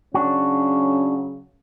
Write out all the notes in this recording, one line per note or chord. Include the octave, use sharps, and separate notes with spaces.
C#3 F#3 C#4 D4 F#4